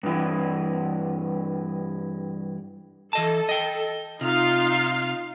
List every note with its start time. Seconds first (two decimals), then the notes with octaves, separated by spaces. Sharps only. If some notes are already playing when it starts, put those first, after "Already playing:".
0.03 G2 E3
3.13 E3 A4 D#5 A5
3.49 D#5 G5
4.21 C3 D#4 F4 F5